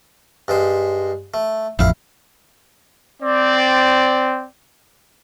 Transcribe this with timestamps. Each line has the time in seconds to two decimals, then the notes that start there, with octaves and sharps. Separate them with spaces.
0.48 G2 G#3 C5
1.34 A3
1.79 A1 F2 E4 F5
3.23 C4 D5